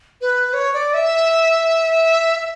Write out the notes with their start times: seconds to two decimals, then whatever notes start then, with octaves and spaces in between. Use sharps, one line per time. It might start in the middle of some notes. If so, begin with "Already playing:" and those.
0.21 B4
0.53 C#5
0.73 D5
0.94 E5
2.40 E5